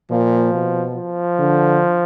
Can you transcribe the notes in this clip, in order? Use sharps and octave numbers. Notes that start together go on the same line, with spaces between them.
A#2 F3
B2
F3
D3